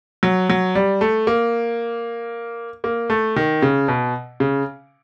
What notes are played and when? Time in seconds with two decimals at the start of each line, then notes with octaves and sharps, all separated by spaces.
0.23 F#3
0.50 F#3
0.75 G3
1.01 A3
1.27 A#3
2.84 A#3
3.10 A3
3.36 D#3
3.62 C#3
3.88 B2
4.40 C#3